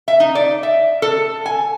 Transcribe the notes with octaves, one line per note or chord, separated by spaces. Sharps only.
E5
D#4
D5
E5
A4
G#5